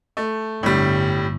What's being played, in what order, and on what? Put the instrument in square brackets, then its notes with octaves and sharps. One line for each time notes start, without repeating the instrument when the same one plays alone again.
[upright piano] A3
[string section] G1 [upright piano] A2 G3